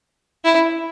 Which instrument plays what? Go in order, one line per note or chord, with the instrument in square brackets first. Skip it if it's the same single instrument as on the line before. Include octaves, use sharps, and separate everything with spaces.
[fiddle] E4